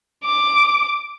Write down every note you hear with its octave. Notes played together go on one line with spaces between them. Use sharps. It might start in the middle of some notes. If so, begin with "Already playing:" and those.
D6